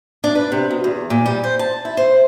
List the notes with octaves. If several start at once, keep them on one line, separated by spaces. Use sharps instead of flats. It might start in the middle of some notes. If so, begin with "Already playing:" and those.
D4
B4
C3
B2
E2
A#2
G3
C5
A5
E4
C5